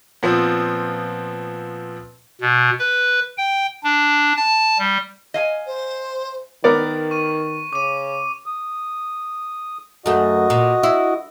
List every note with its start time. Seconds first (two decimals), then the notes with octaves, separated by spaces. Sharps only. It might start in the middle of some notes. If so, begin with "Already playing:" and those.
0.23 A#2 F3 B3 C4
2.41 B2
2.79 B4
3.37 G5
3.84 D4
4.37 A5
4.79 G3
5.34 D#5 F5 G#5
5.67 C5
6.64 D#3 B3 A#4 D5
7.11 C#6 D#7
7.73 C#3 D6 D#7
8.46 D#6
10.06 F#2 A3 F#4 D#5
10.50 A#2
10.83 E4